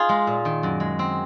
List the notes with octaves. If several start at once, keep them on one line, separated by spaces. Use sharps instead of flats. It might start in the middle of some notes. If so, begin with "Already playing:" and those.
Already playing: D#4 F4 G#4
G#3
A#2
D#3
F#2
G#3
C4